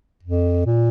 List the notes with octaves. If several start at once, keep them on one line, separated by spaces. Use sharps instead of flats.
F2
A#2